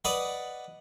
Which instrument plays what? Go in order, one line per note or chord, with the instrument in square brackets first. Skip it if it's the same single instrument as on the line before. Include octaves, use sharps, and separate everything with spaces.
[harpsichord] B4 D5 D#5 F#5